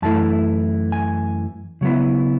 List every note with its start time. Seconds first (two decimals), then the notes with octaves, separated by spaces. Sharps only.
0.02 F#2 E3 A3 E4 A5
0.92 G#5
1.81 C#3 F#3 B3 E4